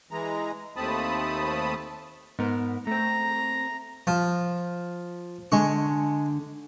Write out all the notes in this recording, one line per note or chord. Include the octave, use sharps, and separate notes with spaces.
E3 G#3 A#5
D#2 A3 C4 A5 B5 D#6
G#2 B3 A#4
A3 C4 A#5
F3
D3 G#3 C#6